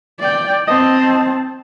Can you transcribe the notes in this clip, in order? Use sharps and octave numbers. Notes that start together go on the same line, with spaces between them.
D5 G5
C4 D#5 A5